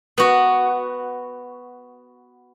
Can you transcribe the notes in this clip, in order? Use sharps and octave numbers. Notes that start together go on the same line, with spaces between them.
B3 F#4